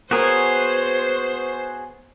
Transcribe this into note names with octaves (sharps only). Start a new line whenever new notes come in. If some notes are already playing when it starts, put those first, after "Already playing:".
B3 F#4 G#4 A#4 C5 C#5